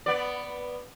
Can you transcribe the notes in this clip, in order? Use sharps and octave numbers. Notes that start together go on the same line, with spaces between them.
B3 D5